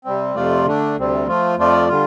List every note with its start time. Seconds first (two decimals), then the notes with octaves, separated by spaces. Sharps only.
0.05 C3 G3 C4
0.35 F2 C3 A3 F4 D5
0.65 D3 A3 D4
0.96 D2 C3 G3 C4
1.27 F3 A3 F4
1.57 F2 F3 A3 F4 D5
1.89 D3 G3 F4